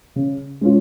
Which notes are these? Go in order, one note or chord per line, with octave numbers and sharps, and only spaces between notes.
C#3
G#3 C#4 F4